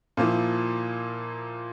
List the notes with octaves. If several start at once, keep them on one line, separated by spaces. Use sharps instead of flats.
A#2 F3 A#3 E4